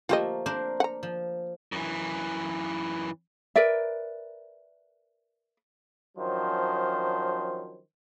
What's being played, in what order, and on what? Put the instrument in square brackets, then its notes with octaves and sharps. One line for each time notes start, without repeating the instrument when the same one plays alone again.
[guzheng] F3 A3 A#3 [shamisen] F4 G4 D#5
[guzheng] D4 A#4 C5
[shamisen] F#5 A#5
[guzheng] F3
[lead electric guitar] F#2 E3
[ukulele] A#4 B4 D5 E5
[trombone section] D#3 F3 F#3 C#4 D4 C5